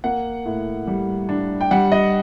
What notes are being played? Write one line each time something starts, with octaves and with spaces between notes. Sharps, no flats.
A#3 F#5
A2
G3
D4
G5
G3 F#5
D#5